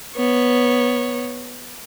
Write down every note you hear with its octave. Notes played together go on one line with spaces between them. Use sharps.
B3 C#5